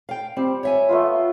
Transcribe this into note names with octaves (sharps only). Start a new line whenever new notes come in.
F5 G5
G3 C4
C#5 E5 G#5
A3 B3 F4